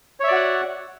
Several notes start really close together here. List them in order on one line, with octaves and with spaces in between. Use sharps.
C#5 E5 D5 F#4 F#5